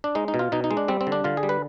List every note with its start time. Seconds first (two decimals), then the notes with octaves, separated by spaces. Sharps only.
0.04 D4
0.15 G#3 D#4
0.28 D#4
0.34 B2
0.39 F4
0.52 B2 D#4
0.64 D#4
0.71 G#3
0.77 D4
0.88 G3 C4
1.01 C4
1.07 D3
1.12 D4
1.24 D3 F4
1.37 G#4
1.43 G3
1.49 B4